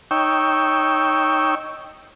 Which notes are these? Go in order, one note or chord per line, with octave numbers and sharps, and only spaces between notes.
D#4 C#5 G5 C#6 E6